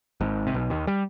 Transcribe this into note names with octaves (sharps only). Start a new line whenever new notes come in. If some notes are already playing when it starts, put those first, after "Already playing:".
G#1 G#2
C3
B1 B2
D#2 D#3
G3